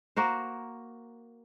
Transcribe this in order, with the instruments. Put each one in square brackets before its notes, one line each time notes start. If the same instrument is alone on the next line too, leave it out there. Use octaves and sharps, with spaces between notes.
[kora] A#3 F#4 A#4 C5